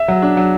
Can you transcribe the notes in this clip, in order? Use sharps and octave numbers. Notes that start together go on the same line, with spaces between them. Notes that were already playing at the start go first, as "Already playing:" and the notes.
Already playing: E5
F#3
D4
F#3